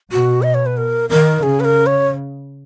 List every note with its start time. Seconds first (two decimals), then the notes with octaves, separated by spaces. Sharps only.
0.12 B2 F#4
0.42 D#5
0.54 C#5
0.66 B4
0.77 A#4
1.10 D#3 A#4
1.43 C#3 G#4
1.60 B4
1.65 A#4
1.86 C#5